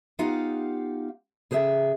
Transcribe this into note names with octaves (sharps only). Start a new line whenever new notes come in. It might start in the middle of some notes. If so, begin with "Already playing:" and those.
B3 D#4 F4 G4 F5 F#5
C#3 G#4 C5 D#5 E5 G5